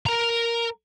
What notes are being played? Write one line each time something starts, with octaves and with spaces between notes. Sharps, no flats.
A#4 A#5